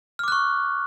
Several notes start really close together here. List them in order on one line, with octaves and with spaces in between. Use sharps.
F6 D6 F#6 C#6